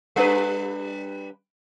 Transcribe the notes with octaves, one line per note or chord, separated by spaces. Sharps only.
G3 D4 B4